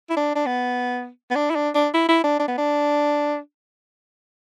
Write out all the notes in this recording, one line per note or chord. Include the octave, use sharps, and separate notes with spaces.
E4
D4
D4
B3
B3
D4
E4
D4
D4
E4
E4
D4
D4
B3
D4